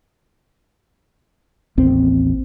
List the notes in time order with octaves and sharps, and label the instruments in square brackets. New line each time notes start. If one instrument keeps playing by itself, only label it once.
[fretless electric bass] A1 D#2 C4